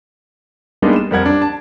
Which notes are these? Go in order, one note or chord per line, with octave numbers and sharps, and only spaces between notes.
G3 G#3 A#3 B3 D4 D#4
E7
F2 G3 A#4 F#5 G#6
D4
A5